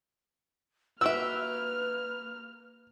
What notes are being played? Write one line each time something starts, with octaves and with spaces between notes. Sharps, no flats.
A#3 F#4 G4 B4 E5 E6 F6